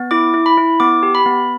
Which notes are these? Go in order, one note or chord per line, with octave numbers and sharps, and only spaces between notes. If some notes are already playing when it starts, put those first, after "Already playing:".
Already playing: B3
E4 D6
E4
B5
E4
B3 D6
G4
B5
B3